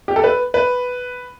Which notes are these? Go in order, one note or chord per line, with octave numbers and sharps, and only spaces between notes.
G4
A4
B4
B4